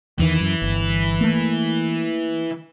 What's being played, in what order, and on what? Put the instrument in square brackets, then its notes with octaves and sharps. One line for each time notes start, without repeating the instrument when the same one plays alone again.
[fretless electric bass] E2 D#3 [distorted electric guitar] E3
[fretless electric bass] F#2
G1
A3 A#3